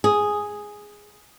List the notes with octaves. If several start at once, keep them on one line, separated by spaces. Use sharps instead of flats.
G#4